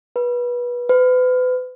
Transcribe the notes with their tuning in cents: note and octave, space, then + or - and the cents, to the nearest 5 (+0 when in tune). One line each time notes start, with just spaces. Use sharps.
B4 -25
B4 +35